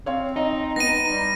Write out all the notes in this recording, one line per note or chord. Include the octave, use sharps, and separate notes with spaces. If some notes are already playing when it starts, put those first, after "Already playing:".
C4 C#5 F5
D#4 D#5 A#5
B3 A#6 D#7
G3